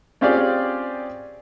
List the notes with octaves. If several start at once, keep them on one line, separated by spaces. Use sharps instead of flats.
C4 C#4 F4 G4 G#4 D5